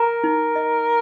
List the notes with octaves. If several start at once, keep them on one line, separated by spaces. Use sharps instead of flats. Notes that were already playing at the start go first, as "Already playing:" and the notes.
Already playing: A#4 A#5
D#4
D#5